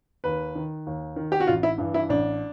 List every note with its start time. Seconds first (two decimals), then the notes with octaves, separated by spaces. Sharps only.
0.24 D#2 B4
0.55 D#3
0.87 D#2
1.16 D#3
1.32 G4
1.40 F#4
1.47 A1 F4
1.63 E4
1.78 G2 E3
1.94 E4
2.09 A1 D4